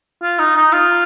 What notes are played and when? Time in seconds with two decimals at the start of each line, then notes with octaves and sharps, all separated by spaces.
0.22 F4
0.39 D#4
0.56 D#4
0.73 F4